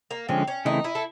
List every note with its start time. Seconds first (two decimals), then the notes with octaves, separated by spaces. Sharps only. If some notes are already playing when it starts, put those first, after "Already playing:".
0.11 A#3
0.29 D3 F3 G#3 C4 C#4
0.47 C#4
0.65 C#3 E3 A3 C4 D#4 E4
0.84 E4
0.95 A4